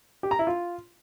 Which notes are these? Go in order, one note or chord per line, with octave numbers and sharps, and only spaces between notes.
G4
A#5
E4
F4